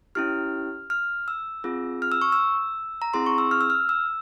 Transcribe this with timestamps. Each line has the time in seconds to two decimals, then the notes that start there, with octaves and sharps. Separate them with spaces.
0.15 C#4 E4 G4 F6
0.90 F6
1.28 E6
1.64 C4 F4 G#4
2.02 F6
2.12 E6
2.21 C#6
2.32 E6
3.02 A#5
3.13 C4 E4 G#4 C6
3.26 C#6
3.38 E6
3.51 F6
3.61 E6
3.70 F6
3.89 E6